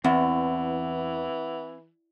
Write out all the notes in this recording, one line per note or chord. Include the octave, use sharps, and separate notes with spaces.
E2 E3 C4 F#5